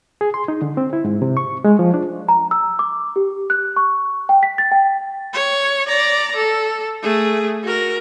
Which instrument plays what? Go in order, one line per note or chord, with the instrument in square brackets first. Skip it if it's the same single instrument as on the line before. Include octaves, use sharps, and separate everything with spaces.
[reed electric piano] G#4
C6
D#4
D3
C4
E4
G#2
C3
C#6
G#3
F3
D4
[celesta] A#5
E6
D6
G4
F#6
C#6
G5
B6
A6
G5
[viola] C#5
D5 A#5
A4
A3 G#4
F#4 A#4